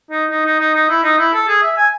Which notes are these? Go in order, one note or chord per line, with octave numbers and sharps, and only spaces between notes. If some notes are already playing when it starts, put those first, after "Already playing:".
D#4
D#4
D#4
D#4
D#4
E4
D#4
E4
A4
G#4
E5
G#5